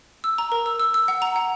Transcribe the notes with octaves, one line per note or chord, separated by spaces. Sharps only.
E6
A#5
A#4
E6
E6
E6
F#5
A#5
F#5